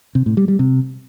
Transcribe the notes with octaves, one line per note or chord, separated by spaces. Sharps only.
C3
A2
G3
G3
C3